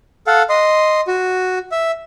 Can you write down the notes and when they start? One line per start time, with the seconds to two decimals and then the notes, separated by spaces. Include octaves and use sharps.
0.27 A4 F5 F#5
0.49 D#5 C6
1.08 F#4
1.72 E5